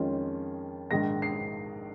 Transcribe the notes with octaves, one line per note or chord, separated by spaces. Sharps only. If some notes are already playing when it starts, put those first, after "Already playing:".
Already playing: F2 D#3 G#3 C#4 F4
A#1 G#2 D#3 A#6
C7